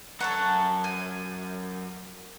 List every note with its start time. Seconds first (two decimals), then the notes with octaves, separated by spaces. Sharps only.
0.20 F#2 A4 C#5 F#5 A#5
0.84 G#5